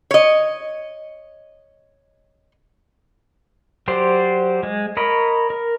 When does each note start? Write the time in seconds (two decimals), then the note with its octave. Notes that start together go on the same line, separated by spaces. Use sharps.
0.11 C#5 D#5
3.88 F#3 G4 C5 D5
4.63 G#3
4.97 A#4 C#5 D#5 B5
5.50 A#4